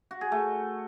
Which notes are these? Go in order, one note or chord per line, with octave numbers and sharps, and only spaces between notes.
F#4
G#4
A3